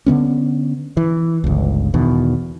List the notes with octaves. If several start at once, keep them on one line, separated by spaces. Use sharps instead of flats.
D3 E3 B3 C#4
E3
G1 C#2
E2 B2 D#3